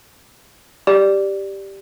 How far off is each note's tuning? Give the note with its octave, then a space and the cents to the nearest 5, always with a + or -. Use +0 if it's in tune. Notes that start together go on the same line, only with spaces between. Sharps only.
G4 +0 D5 +0